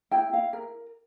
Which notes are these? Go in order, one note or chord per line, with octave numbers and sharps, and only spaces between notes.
E4 G5
E4 F5
A#4